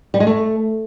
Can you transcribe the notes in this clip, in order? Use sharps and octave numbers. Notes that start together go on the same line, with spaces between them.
G3
G#3
A3